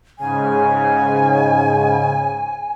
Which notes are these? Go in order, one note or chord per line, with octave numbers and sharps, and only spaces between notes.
G#2 C#3 G#5